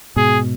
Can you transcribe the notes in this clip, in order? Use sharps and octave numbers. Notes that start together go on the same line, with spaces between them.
G#2 B2 G#4